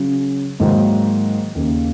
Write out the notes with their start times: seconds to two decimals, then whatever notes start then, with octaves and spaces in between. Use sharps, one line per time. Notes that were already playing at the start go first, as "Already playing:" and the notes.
Already playing: C#3 F#3 C#4
0.60 G#2 D#3 F#3 A#3 D#4
1.55 D#2 C#3 A#3